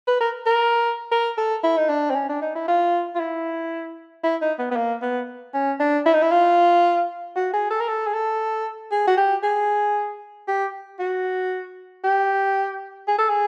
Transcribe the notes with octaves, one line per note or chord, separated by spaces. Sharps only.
B4
A#4
A#4
A#4
A4
E4
D#4
D4
C4
C#4
D4
D#4
E4
F4
F4
E4
E4
D#4
B3
B3
A#3
B3
C#4
D4
E4
D#4
E4
F4
F#4
G#4
A4
A#4
A4
G#4
A4
G#4
F#4
G4
G#4
G4
F#4
G4
G#4
A4
G#4